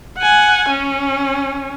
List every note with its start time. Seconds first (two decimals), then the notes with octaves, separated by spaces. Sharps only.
0.18 F#5 G#5
0.69 C#4